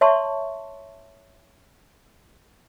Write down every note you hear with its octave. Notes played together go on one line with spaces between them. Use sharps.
C#5 E5 A5 C6 C#6